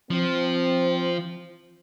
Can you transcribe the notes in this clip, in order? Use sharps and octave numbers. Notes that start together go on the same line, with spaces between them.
F3 C4